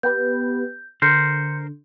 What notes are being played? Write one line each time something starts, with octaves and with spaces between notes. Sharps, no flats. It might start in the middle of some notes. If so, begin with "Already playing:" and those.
B3 G4 B4 G6
D3 A#4 C5 C6 G6 C#7